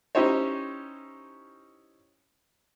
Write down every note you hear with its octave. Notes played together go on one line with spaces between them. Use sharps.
C#4 D#4 E4 G4 C5 C#5